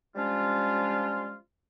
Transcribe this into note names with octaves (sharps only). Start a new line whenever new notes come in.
F3 G3 G#3 C#4 D4 F4